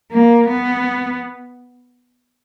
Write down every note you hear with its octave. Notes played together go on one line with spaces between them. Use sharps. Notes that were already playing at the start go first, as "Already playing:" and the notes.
A#3
B3